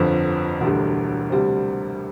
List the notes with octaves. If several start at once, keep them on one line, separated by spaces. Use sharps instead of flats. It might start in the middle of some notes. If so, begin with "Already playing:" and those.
Already playing: G1 F2 D3 F3 C4
E1 D2 D3 G3
D2 C3 G3 C4